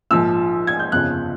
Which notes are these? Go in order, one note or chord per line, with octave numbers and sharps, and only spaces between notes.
A#1 G#2 F3 E6
G#6
G6
G1 F2 C#3 F3 F#6